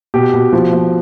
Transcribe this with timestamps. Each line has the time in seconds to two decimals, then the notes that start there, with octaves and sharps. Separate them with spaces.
0.14 B2 G4
0.34 B2
0.53 F3
0.73 F3